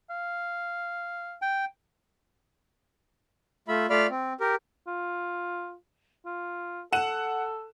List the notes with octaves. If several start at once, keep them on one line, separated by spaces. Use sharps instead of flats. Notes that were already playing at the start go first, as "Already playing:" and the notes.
F5
G5
A3 F4 E5 B5
A3 F4 D5 F5 B5 F6
C4
G4 A#4
F4
F4
A4 F#5 E7